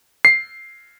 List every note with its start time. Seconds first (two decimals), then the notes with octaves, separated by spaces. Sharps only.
0.25 C7